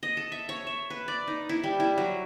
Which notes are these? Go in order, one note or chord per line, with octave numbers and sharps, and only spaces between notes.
D#5
A4
E5
C#5
E5
B4
D5
D#4
E4
G3
E4
F#3